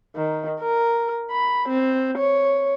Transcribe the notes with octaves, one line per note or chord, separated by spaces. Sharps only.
D#3
A#4
B5
C4
C#5